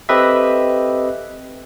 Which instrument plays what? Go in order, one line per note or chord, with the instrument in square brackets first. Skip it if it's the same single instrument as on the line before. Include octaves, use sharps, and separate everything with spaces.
[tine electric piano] C4 G4 A4 B4 D#5 E5